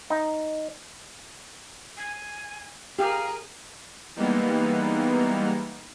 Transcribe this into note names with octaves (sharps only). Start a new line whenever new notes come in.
D#4
G#5
G4 G#4 A#4 F5
E3 G3 G#3 A#3 B3 D#4